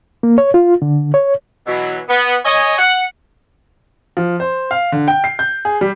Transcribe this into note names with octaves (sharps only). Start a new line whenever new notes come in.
A#3
C#5
F4
D3
C#5
B2 E3 F#3
B3
C#5 D#5 G#5
F#5
F3
C5
F5
D3
G5
C7
G6
G#4
G3